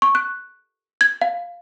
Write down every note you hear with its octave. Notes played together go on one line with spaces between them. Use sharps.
C#6
F#6
G#6
F5